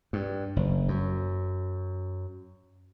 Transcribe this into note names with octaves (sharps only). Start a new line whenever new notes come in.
G2
F#1
F#2